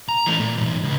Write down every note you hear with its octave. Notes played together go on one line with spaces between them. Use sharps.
A#5
E3 A3
A#2
E2 G#2
C#2